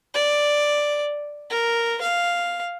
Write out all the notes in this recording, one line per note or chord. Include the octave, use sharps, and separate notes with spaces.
D5
A#4
F5